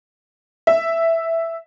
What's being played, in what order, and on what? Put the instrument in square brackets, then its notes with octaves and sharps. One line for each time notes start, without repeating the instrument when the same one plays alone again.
[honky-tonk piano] E5